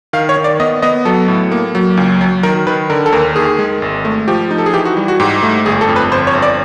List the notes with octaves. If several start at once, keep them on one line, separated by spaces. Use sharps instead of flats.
D#3 F5
C#5
D#3
D5
B3 D#5
B3 D#5
F#3 A4
A2
A#3
F#3
C#2
F#3
D#3 A#4
D#3 B4
D3 A#4
A4
D#2 A#4
D#3 G#4
G#3
G#1
A3
F3 G4
D#4
A4
G#4
E3 G4
F#4
G3
F#4
G#2 G4
A3
G1 G#4
A4
F2
B4
G1 C5
C#5
G1
D5